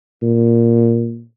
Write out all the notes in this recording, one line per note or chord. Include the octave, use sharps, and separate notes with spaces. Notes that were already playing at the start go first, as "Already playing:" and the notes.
A#2